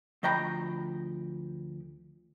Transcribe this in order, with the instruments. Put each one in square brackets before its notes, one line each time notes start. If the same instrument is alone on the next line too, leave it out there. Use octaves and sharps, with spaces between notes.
[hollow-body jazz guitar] D2 F3 D#5 G5 A#5 B5